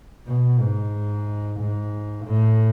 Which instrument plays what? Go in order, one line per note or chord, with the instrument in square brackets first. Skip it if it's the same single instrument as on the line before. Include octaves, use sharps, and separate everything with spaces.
[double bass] B2
G#2
G#2
A2